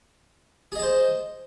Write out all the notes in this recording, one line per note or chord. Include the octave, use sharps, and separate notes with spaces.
G#4 C5 D#5 A5